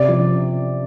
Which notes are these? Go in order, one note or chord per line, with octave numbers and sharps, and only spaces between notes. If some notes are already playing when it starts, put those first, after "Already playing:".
Already playing: C3 D5
F3